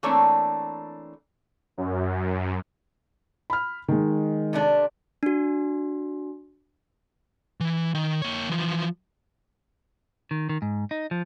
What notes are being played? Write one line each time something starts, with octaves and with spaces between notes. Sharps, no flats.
E3 A3 A#3 C4 D4 C#5
F#2
B5 F6
D#3 G#3
C3 A3 D4
D4 F#4
E3
D#3
A#3 C#5
E3 F3
D#3
D#3
G#2
D#4
F3